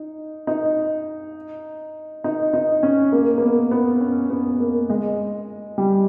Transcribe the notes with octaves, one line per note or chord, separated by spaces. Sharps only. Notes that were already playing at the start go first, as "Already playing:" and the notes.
Already playing: D#4
D#4
D#4
D#4
C#4
A#3
A#3
B3
B3
C#4
B3
A#3
G#3
G3